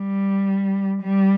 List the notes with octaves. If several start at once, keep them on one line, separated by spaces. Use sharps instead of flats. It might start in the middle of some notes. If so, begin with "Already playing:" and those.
Already playing: G3
G3